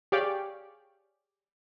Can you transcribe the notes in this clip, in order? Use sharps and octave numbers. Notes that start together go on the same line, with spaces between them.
G4 G#4 C#5 D5 F5 G5